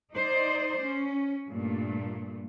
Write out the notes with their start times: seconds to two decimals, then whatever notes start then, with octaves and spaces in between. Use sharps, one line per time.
0.13 D#4 C5 D5
0.84 C#4
1.49 G2 A#2 A3